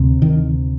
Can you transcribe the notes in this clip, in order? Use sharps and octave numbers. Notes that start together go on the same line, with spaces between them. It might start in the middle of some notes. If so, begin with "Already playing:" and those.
Already playing: D2 C3
D#3